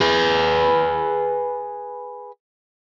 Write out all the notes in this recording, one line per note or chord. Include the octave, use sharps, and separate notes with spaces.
G#4 B4